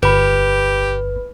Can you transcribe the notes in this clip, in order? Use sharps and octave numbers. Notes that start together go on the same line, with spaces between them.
G1 G4 B4 B5